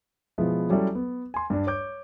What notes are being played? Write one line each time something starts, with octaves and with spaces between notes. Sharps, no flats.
B2 F3 G#3 B3 E4
F#3 G3 C#4 E4 A4
B3
G#5 C6
G2 D4
C#5 D6 G6